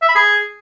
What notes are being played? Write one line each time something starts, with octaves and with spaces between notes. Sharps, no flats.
E5
B5
G#4